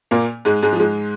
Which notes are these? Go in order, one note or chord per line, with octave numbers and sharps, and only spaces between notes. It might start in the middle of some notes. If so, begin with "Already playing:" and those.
A#2 A#3
G#2 G#3
G#2 G#3
F3
G#2 G#3